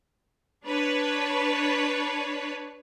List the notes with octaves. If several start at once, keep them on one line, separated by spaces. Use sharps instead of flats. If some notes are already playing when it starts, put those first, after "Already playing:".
D4 B4 C#5